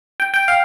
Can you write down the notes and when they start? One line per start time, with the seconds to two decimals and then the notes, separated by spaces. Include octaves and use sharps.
0.20 G5
0.34 G5
0.48 F5